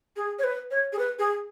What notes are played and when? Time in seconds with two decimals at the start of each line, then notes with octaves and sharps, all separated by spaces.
0.16 G#4
0.39 C#5
0.44 B4
0.71 C#5
0.93 G#4
0.99 B4
1.19 G#4